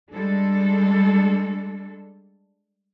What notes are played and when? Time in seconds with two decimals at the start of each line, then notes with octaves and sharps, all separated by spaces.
0.11 G3 G#3 D4 A4